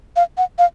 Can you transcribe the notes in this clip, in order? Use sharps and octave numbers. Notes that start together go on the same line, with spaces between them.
F5
F#5
F5